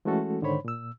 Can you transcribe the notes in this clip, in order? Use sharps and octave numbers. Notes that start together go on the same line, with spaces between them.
E3 G#3 A3 C#4 F#4 A4
G#2 D3 D#3 C5 C#5 B5
A#2 E6